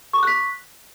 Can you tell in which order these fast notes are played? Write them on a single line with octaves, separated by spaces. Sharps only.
C#6 D6 F#6 B6